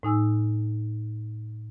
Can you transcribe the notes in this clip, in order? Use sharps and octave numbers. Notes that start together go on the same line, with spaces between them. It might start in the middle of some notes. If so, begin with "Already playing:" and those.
A2 D#4 G#5 E6